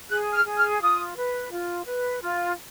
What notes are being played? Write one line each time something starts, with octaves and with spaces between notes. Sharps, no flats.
G#4 F#6
F6
G#4
F6
F4 D#6
B4
F4
B4
F4